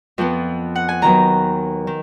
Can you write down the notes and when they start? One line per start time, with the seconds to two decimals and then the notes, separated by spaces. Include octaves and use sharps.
0.18 F2 F3 B3
0.75 F#5
0.89 G#5
1.02 D#2 D#3 F#3 B3 A#5
1.87 D#3